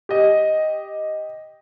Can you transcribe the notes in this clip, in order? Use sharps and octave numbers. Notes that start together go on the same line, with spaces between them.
G4 D#5